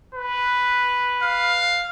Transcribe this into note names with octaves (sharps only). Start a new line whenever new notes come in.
B4
F5